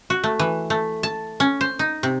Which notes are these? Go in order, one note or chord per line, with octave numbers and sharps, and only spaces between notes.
F#4
A3
E3
A3
A5
C#4
C5
D#4
C3